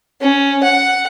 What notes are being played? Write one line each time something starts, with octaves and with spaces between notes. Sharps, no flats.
C#4
F#5